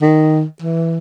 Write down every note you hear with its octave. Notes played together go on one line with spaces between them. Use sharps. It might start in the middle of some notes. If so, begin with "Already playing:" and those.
D#3
E3